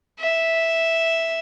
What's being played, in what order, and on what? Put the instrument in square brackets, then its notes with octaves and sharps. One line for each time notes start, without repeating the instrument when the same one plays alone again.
[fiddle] E5